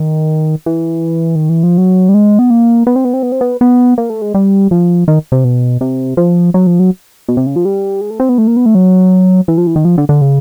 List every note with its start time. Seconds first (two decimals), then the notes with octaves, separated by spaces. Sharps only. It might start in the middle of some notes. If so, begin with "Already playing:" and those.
Already playing: D#3
0.66 E3
1.36 D#3
1.49 E3
1.63 F3
1.77 F#3
2.09 G3
2.14 G#3
2.39 B3
2.50 A#3
2.87 B3
2.96 C4
3.05 B3
3.14 C4
3.23 B3
3.32 C4
3.41 B3
3.61 B3
3.98 A#3
4.10 A3
4.22 G#3
4.34 G3
4.71 F3
5.08 D#3
5.32 C3
5.44 B2
5.81 C3
6.17 F3
6.54 F#3
6.67 F3
6.79 F#3
7.28 B2
7.37 C3
7.47 C#3
7.56 F3
7.65 G3
8.01 G#3
8.10 A3
8.20 C4
8.29 B3
8.38 A3
8.47 A#3
8.57 B3
8.66 A3
8.75 F#3
9.48 E3
9.58 F3
9.67 E3
9.76 D#3
9.85 F3
9.98 D3
10.09 D3
10.21 C#3